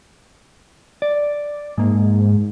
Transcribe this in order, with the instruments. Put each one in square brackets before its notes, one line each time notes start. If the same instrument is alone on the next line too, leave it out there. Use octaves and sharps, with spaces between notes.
[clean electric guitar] D5
[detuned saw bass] G#2 [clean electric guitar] G#3 A#3